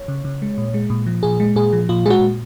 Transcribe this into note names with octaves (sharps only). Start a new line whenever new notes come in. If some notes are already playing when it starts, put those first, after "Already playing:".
Already playing: C#5
C#3
C#3
G#3
A#2
G#3
A#2
F3
A#2 G#4
G#3
A#2 G#4
F3
A#2 F4
G#3 F#4 G#4
A#2